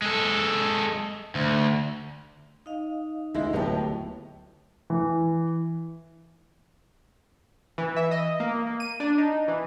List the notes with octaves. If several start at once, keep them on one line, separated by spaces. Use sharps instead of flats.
G#3 A4
D2
D#4 D#5 F5
D2 G#2 G#3 E4 E5
D1 D#2 A2 F#3 B3 G4
E3
E3
E5
D#5
A#3
A#3
D#7
D4
D#4
E3